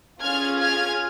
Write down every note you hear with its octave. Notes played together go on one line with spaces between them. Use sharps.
C#4 F4 G#4 F6 G#6
F6 G#6